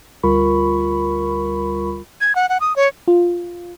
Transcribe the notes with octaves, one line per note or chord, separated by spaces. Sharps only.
D2 G3 F4 A#4 B5 C#6
G#6
F#5
F#5
D#6
C#5
F4